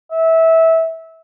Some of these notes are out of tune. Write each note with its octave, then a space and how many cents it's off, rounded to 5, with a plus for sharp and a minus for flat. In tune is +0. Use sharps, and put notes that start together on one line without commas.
E5 -20